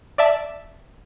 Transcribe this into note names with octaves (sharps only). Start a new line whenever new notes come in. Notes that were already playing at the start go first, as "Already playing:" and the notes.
D5 E5 A5